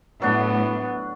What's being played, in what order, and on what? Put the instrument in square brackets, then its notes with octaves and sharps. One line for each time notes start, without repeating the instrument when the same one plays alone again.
[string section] A2 [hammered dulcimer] F#3 D4 [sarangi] B3